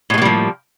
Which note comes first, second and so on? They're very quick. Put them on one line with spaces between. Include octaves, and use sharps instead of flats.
A2 G#3 A#3 G3 F3